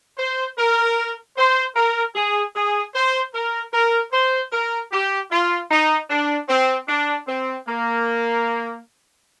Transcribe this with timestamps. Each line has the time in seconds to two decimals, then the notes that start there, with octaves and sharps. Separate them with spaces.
0.18 C5
0.58 A#4
1.37 C5
1.76 A#4
2.15 G#4
2.55 G#4
2.95 C5
3.34 A#4
3.73 A#4
4.13 C5
4.52 A#4
4.92 G4
5.31 F4
5.71 D#4
6.10 D4
6.49 C4
6.88 D4
7.28 C4
7.68 A#3